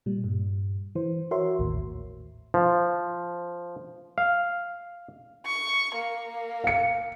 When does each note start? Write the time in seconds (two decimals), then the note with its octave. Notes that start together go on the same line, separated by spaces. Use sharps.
0.06 A#2 G3
0.24 G2
0.95 E3 C5
1.31 F#4 A#4 C#5 E5 C6
1.59 A1 D#2 A2
2.54 F3
4.18 F5
5.46 C#6
5.96 A#3
6.64 F5 C#7